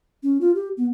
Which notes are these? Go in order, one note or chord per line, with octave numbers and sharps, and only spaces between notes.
C#4
F4
G4
B3